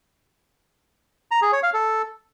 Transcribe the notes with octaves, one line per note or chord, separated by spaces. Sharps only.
A#5
G#4
C#5
F5
A4